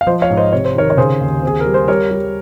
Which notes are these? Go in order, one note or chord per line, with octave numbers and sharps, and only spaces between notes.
F5
F3 C5 D#5
C#5 F5
G#2
C5 D#5
C3 C#5
C5
D#3 A#4 C#5
C#5
C#3 G#4 C5
D#2
C4 G#4
A#4
G3
C5
G3 A#4 C#5
G3